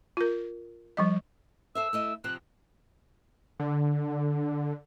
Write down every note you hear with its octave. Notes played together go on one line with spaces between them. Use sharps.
F4 A#4
F3 G3 D#5
A4 C5 E5 E6
A3 E4 D#5
C3 F3 C4 F#6
D3